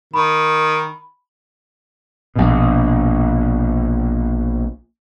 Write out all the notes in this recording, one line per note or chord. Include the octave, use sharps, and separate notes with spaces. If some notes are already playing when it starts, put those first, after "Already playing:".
D#3 B5
A#1 B2